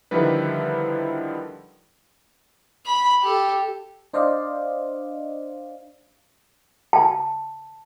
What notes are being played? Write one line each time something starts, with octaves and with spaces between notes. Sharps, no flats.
D3 D#3 F3 G3 E4 B4
B5
G4 A4
D4 C5 D5 D#5 F5
A5